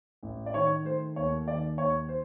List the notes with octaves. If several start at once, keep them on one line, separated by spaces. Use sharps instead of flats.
A1
D5
D#3 C#5
A3 C5
D#2 C#5
D#3 D5
D#2 C#5
C5